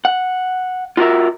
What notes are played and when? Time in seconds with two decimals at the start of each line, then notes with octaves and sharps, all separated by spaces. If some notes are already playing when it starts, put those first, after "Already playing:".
0.05 F#5
0.97 F4 F#4 A#4 E5